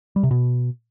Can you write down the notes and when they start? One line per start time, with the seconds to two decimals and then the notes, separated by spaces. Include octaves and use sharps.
0.16 G3
0.23 C3
0.31 B2